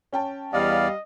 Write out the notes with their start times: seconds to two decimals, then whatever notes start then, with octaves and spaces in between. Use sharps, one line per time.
0.13 C#4 G5 A5
0.53 E2 G3 D5 D#5 F5